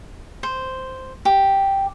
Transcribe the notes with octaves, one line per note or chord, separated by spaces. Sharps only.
C5
G4